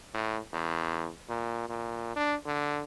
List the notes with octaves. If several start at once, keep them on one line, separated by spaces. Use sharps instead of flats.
A2
E2
A#2
A#2
D4
D3